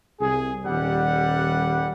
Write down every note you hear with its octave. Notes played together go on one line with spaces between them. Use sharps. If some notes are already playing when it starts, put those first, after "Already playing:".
C2 G#4
D#1 G3 F#5